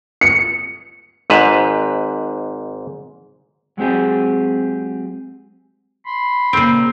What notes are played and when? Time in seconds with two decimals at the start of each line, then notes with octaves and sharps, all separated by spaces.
0.21 C#7
1.30 G#1 G#2 B4
3.78 F#3 G#3 C4 G4 G#4
6.06 B5 C6
6.53 A#2 C#3 C4